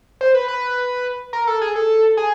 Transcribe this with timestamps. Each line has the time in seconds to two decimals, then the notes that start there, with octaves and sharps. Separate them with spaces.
0.21 C5
0.34 B4
0.48 B4
1.33 A#4
1.47 A4
1.62 G#4
1.76 A4
2.17 G#4